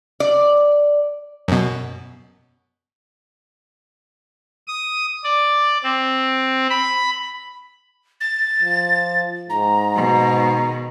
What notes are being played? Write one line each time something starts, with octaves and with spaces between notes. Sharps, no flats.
D5
F#2 B2
D#6
D5
C4
B5
A6
F3
G#2 A#5
B2 D#3